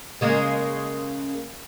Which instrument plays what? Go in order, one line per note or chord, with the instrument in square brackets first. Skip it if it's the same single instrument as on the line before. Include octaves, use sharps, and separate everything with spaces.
[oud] C#3 G#3 A#3